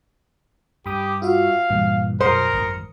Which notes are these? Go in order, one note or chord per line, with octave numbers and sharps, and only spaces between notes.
G2 G4 B5 D6 D#6
F4 F#4 E5 F5
G2 A#2 E3
F#2 B2 A#4 C5 D#6 C#7
G#1 F#2